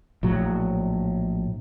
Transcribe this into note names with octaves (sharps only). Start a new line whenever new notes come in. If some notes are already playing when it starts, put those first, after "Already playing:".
A#1 A2 F#3